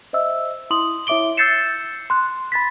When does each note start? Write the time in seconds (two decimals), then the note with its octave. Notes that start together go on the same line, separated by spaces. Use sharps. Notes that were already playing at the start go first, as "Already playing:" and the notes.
0.13 C5 D#5 E5 E6
0.70 E4 C6 D#6 F#7
1.07 E4 C#5 E5 D6 D7 G7
1.37 E6 G6 A6 C7 C#7 E7
2.10 C6 F#6
2.52 B5 A6 B6